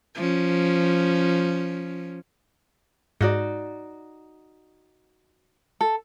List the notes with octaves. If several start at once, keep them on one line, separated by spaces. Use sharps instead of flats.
F3 C#4
G#2 D#4 F#4 D5
A4